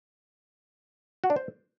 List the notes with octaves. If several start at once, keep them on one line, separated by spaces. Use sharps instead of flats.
F#4
D4
C5